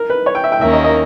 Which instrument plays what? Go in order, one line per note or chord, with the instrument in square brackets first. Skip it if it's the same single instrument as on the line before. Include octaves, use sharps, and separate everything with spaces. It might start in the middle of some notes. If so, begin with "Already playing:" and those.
Already playing: [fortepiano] A#4
B4
C#5
G5
E5
G5
[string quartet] D#2 D#3 A#3 C#4 [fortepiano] E5
[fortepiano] D#5
D#5